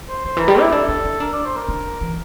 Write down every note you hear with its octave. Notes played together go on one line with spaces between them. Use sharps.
C5
D3 C5
E3 A#4
G3
E4 G4
D4 A4
D4
E4
D4 A#4
D5
C5
A#4
D4
E3